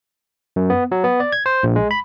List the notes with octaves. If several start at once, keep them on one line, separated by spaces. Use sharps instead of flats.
F#2
B3
F#3
B3
D5
G#6
C5
A#1
G#3
B5